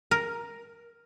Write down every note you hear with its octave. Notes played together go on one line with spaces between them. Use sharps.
A#4